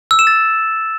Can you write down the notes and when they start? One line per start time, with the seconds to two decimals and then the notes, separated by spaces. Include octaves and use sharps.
0.11 E6
0.19 E7
0.27 A6